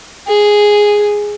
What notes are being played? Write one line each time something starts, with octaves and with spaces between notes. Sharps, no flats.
G#4